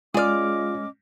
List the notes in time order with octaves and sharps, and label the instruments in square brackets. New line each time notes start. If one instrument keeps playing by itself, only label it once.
[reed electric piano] G#3 F6 [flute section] C#4 D#5 D6 [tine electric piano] F4 [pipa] G#4 D5